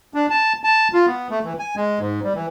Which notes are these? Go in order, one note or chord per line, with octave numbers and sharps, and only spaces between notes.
D4
A5
A5
F4
B3
A3
E3
G#5
G#3
G#2
G3
E3